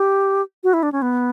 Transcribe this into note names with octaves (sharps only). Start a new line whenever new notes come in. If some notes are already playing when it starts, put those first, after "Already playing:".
Already playing: G4
F#4
E4
D4
C#4
B3